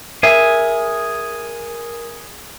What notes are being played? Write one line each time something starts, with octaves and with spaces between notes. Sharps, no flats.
G#4 A#4 E5 G#5